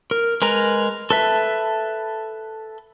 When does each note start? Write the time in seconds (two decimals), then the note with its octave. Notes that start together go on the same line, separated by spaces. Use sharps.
0.11 A#4
0.42 G#3 A#4 B4 A#5
1.10 A4 B4 E5